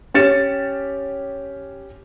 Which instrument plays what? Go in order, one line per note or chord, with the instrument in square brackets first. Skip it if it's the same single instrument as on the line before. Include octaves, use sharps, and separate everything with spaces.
[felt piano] C#4 G4 A6 C#7 E7